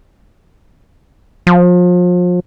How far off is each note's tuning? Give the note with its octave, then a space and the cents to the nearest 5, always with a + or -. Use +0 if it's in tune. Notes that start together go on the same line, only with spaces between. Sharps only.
F3 +35